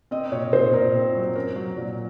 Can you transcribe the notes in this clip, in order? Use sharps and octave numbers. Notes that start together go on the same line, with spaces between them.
C4 D#5
A#2 C#5
A#2 C5
A#2 A#4
C4
F#3
C#4 A#4
F#3
A#2